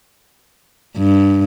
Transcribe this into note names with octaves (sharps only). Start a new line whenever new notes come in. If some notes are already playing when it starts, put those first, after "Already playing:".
G2